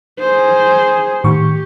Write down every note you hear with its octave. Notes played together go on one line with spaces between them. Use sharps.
G#4 C5
A2 D#3 G4 C#6